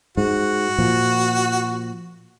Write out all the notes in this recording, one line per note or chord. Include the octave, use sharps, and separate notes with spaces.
G#2 F#4
A#2 F3